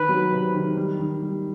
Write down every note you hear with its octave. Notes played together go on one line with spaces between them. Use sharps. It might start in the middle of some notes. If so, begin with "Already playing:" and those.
Already playing: D#3 B4
F#3
C3
D#3
G3
D#3
G3